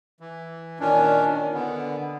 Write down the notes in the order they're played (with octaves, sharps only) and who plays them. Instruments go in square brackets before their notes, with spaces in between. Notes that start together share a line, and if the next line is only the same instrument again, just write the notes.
[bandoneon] E3
A#2 D#3 C#4 D4
D#3
D3 B3